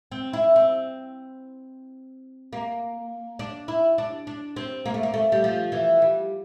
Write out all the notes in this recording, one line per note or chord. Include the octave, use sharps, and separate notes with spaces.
C4
E4
C4
A#3
D4
E4
D4
D4
C4
A#3
A3
A#3
A3
G3
F3
E3
G3